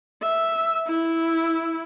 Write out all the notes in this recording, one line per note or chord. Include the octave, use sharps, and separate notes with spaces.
E5
E4